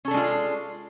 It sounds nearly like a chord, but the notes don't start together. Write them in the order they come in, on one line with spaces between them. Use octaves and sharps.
C#4 A4 D4 G#3 F4